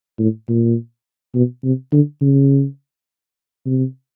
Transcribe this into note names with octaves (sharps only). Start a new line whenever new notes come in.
A2
A#2
B2
C3
D3
C#3
C3